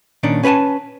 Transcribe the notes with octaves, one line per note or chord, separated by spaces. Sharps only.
A#2 D#3 C#4 D4
C#4 B4 F#5 G#5 A5